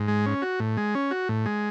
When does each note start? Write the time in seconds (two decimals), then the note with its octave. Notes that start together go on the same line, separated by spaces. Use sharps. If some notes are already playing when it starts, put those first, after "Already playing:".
Already playing: G#2
0.08 G#3
0.26 C#4
0.42 F#4
0.60 A2
0.77 G#3
0.95 C#4
1.11 F#4
1.29 A2
1.46 G#3